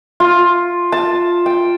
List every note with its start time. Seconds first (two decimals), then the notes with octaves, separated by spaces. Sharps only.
0.20 F4
0.92 A5
1.46 G5